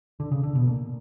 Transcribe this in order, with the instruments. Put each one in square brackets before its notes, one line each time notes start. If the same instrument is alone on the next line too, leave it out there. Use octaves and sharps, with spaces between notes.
[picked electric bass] D3
C#3
D3
B2
A#2